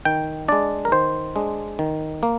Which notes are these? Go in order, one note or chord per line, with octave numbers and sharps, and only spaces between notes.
D#3 G5
G#3 D4 D5
A#4
D#3 C5
G#3 D4
D#3
A#3